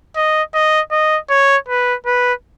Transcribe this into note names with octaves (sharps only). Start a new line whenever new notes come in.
D#5
D#5
D#5
C#5
B4
B4